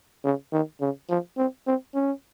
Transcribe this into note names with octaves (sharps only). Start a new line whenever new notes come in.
C#3
D#3
C#3
F3
C4
C4
C#4